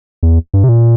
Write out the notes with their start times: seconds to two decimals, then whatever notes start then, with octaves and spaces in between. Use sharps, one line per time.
0.23 E2
0.54 G2
0.64 C3
0.69 A#2